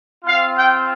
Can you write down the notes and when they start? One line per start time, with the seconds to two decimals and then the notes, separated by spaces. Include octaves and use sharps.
0.25 C4 F4 F5
0.57 G5